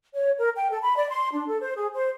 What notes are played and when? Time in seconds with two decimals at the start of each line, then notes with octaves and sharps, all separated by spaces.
0.14 C#5
0.38 A#4
0.56 G5
0.71 A4
0.82 B5
0.96 D5
1.09 C6
1.34 D4
1.48 A4
1.60 C5
1.76 G#4
1.94 C5